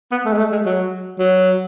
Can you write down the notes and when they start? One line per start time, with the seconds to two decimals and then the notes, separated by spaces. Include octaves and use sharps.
0.12 B3
0.25 A3
0.33 G#3
0.38 A3
0.52 G#3
0.66 F#3
1.19 F#3